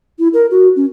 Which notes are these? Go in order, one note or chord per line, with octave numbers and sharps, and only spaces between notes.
E4
A#4
F#4
C#4